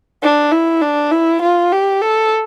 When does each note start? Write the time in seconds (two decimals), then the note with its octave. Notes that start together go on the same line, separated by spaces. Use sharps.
0.23 D4
0.52 E4
0.82 D4
1.12 E4
1.42 F4
1.72 G4
2.02 A4